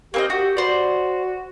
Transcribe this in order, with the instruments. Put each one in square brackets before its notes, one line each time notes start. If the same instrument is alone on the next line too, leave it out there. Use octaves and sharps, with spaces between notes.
[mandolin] A#3 C4 D#5 [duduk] G4
[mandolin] F#4 [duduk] G4
[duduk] F#4 [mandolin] C5 D5